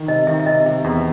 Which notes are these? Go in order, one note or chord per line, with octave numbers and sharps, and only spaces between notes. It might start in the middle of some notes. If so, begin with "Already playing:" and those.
Already playing: D#3
C3 D#5
D#3 E5
E5
C3 D#5
C3 E5
E2